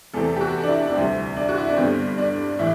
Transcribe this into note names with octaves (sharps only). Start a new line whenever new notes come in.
E2 C3 E3 A3 C4 A4
G4
F#4
D4
E4
D4
D2 C3 G3 C4 E4
D4
F#4
E4
D4
G2 D3 G3 B3 C4
D4
A2 E3 A3 E4